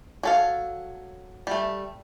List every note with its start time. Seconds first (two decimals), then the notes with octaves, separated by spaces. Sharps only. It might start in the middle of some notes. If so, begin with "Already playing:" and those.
0.23 F#3 A4 F5
1.47 G3 A3